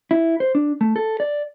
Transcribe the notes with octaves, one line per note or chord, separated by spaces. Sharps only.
E4
C5
D4
A3
A4
D5